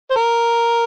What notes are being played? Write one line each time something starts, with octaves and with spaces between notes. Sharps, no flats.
C5
A#4